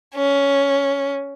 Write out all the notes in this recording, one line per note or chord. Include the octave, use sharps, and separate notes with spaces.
C#4